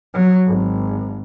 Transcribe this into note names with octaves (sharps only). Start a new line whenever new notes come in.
F#3
G#1